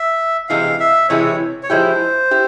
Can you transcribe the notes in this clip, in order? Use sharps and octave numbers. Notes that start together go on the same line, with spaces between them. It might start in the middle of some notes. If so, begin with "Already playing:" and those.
Already playing: E5
C3 E3 G#3 E4 F5
E5
C3 E3 G#3 E4 C#5
C#5
F3 G#3 E4 G4 C5
E4 G4